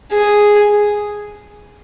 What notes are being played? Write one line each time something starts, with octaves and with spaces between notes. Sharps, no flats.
G#4